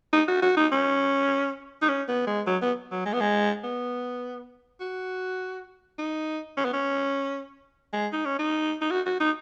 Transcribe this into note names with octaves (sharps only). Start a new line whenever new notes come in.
D#4
F#4
F#4
D#4
C#4
D#4
C#4
B3
G#3
F#3
B3
F#3
G#3
B3
G#3
B3
F#4
D#4
C#4
B3
C#4
G#3
D#4
C#4
D#4
D#4
F#4
F#4
D#4